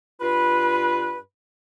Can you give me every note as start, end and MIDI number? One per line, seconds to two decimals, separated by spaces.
0.21 1.18 43
0.21 1.18 65
0.21 1.18 71